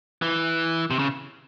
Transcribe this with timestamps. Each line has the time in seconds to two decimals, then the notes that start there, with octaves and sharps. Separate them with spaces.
0.22 E3
0.90 C3
0.99 C#3